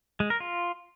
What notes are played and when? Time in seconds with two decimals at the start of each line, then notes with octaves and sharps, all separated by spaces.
0.20 G#3
0.30 A#4
0.40 F4